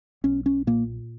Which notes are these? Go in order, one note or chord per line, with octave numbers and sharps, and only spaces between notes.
B1 C#4
C#4
A#2 A#3